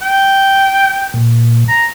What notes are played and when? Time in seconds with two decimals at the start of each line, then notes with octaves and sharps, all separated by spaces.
0.02 G5
1.14 A#2
1.68 A#5